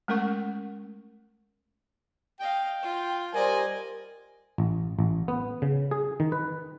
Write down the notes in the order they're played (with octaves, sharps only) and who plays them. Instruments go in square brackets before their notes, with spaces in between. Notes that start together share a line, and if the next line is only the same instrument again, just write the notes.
[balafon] G#3 A3 C#4 A#4 F#5 C#6
[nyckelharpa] D#5 F5 [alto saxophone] G5
[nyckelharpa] F4
[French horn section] G3 A#4 C5 [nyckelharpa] D5 D#5 [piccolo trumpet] G#5
[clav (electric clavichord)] A1
A1
B3
C#3
G#4
D#3
B4